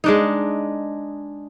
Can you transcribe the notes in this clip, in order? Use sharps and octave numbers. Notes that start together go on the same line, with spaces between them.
G#3 D4 D#4